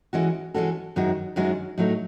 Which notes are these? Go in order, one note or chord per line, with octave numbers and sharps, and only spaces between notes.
E3 G#3 C#4 F#4 A4
E3 G#3 C#4 F#4 A4
F#2 D#3 G#3 C#4 F#4
F#2 D#3 G#3 C#4 F#4
A2 F#3 A3 D#4